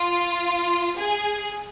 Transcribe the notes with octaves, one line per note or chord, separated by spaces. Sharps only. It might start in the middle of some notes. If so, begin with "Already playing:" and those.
Already playing: F4
G#4